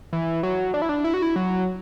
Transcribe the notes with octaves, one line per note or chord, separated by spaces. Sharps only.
E3
F#3
D4
E4
D4
E4
F#4
E4
F#3